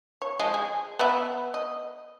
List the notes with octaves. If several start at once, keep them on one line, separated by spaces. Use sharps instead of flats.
C#5
F3 G#3 D#5
G#4
B3 B4 E5
D#5